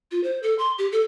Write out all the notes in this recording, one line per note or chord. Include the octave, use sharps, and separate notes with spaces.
F4
C5
A4
C6
G4
A4